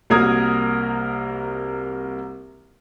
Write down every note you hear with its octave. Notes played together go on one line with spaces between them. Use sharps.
C2 A#3 F#4 A#4 D#6 G#6